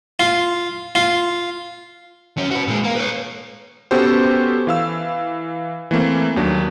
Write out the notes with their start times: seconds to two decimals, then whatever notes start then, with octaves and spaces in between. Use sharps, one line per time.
0.20 F4
0.95 F4
2.37 F#3 C#4
2.51 F#4 B4
2.67 A#2 G#3
2.84 A#3
2.96 B4 C#5
3.91 B3 C#4 F#4 G4 A4 C5
4.67 E3 F5 E6
5.91 E3 A3 A#3 C4
6.36 D#2 F#3 D4